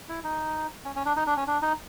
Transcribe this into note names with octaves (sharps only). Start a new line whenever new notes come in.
E4
D#4
C#4
C#4
D4
D#4
D4
C#4
D4
D#4